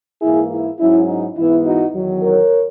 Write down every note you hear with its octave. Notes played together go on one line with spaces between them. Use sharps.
G#2 E3 A#3 E4 G#4
E4
G#2 F#3 C#4 E4
D#4
G#2 E3 B3 E4
D#4 F#4
E2 D#3 F#3
A#4 C#5